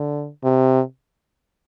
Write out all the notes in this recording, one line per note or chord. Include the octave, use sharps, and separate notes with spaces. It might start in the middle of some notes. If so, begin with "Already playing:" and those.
Already playing: D3
C3